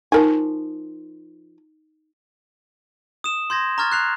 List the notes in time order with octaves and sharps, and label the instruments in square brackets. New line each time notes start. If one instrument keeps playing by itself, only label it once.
[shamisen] F3 A#4 G#5 [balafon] D#4
[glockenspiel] D#6 E7
C6 G6 G#6 A#6
A#5 C#6 F6 G#6 A6
F#6 C7 F7